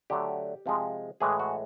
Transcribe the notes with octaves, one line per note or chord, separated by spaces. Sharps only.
D3 F#3 A3 G4
C3 F3 G#3
A2 E3 G#3 G#4
F#4